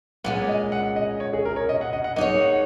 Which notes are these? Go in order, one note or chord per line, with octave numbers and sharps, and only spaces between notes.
A#2 G#3 C#4 F#5
D#5
F#5
D#5
C#5
G#4
A#4
C#5
D#5
F#5
D#5
F#5
A#3 D#4 G#4 C#5 D#5
F#5